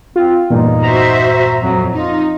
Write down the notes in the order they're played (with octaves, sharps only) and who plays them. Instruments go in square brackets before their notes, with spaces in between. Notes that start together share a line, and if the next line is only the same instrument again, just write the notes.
[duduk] C4 [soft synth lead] F4
[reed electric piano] E2 G2 A#2 [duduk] D#4
[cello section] F#4 C5 E5 [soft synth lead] A#5
[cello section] F2 [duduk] F#3
[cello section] D#4 [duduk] F4